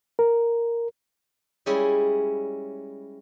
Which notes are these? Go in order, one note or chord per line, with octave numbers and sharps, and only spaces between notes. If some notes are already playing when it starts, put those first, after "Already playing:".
A#4
G3 G#3 C#4 E4 G#4